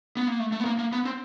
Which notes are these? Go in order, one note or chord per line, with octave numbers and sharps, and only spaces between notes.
B3
A#3
A3
A3
B3
A#3
A#3
B3
C4